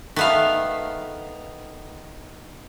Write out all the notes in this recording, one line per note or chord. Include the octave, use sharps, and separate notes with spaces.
D#3 A3 B3 B4 F5 A5